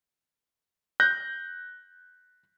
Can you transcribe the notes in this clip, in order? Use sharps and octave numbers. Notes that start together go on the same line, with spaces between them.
F#6 G6 A#6